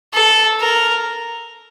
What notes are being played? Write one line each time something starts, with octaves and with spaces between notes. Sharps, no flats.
A4
A#4